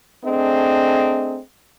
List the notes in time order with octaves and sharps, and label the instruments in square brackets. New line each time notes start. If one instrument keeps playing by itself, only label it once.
[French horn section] A3 C4 D4 G#4 D#5